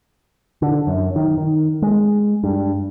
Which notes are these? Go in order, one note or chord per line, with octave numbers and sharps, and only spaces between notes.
D3
F#2
D#3
D#3
G#3
G2